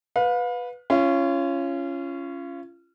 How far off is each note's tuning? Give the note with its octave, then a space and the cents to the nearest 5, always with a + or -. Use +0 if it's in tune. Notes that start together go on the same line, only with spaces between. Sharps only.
B4 +0 F5 +35
C#4 +0 F4 -30